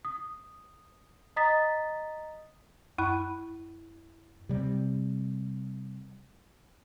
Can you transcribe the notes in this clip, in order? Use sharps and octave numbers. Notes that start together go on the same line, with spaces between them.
D#6
D#5 A#5 D#6 A6 B6
F#2 E4 B5 F#6
C3 G3